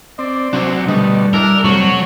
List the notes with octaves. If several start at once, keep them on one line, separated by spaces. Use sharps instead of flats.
C4 D5
C3 F#3 D4 C5
B2 D3 G3 A3 D#5
D4 E4 A#4
C3 F#3 A3 F#4 C#6